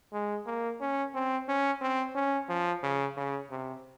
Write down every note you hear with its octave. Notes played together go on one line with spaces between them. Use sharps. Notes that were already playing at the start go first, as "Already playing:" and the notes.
G#3
A#3
C#4
C4
C#4
C4
C#4
F3
C#3
C#3
C3